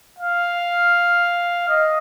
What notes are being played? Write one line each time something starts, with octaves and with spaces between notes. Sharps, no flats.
F5
D#5